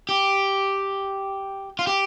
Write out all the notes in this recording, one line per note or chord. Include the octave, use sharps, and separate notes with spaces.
G4
F4
G4